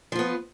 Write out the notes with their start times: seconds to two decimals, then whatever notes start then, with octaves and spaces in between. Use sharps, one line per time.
0.12 F3
0.15 F4
0.19 B3